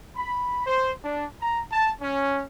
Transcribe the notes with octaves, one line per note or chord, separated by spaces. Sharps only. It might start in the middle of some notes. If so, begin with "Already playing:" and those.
B5
C5
D4
A#5
A5
C#4